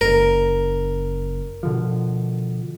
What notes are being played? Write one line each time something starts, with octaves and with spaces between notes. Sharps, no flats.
F#1 A#4
B2 D3 F3